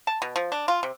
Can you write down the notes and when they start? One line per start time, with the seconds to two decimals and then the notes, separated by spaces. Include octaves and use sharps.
0.07 A5
0.22 B2
0.36 F3
0.52 D4
0.68 F4
0.83 C3